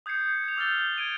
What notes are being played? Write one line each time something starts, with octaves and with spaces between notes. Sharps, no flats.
D#6 G6 G#6 C7 C#7
G6 F7
D6 E6 F6 G6 A6 G7
G#6 D7 D#7